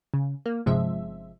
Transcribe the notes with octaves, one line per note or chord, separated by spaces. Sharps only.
C#3
A#3
G1 C3 F3 G#3 E5